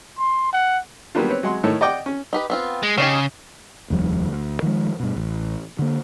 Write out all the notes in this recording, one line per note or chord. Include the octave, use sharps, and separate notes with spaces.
C6
F#5
F#3 G3 A#3 B3 D4 F4
C4 B4 C#5
F#3 G#3 F#5 C6
A2 D#3 A4 C#5
D5 D#5 F#5 G5 D6
C#4
D#4 G4 B4
B3 C4 F4
G#3
C#3 C#4 D#4 G4
F1 D#2 F3 G3
D2
D#3 F3 F#3 G#3
G2 B2
A1
D3 A#3